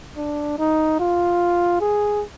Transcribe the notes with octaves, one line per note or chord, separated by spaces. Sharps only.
D4
D#4
F4
G#4